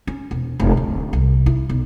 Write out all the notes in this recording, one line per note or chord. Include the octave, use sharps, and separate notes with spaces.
C#4
E1
F1
D1
C2
E4
B1